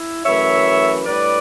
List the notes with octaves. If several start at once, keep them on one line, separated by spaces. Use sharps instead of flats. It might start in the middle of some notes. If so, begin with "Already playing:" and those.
Already playing: E4
F#2 E3 A3 C#5 E5
A2 G3 D4 B4 D5